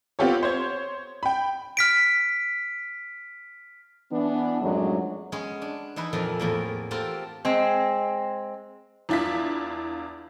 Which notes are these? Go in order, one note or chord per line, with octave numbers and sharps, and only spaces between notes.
B3 C4 F4 G4 A4 C#5
C5 C#5 G#6
G5 B5
F6 B6 D7
E3 B3 D4
F#2 A2 F3 F#3 G#3 D4
G#3 B3 C#4 C#5
D4
E3 D#4 E4 B4
F2 A#2 E3 F3
E2 A2 A#3
C4 F4 G4 A4 A#4
G#3 C4
E2 D4 E4 F4 B6